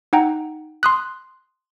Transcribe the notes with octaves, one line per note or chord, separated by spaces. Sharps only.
D#4 F#5 G5 A#5
C6 D#6 F#6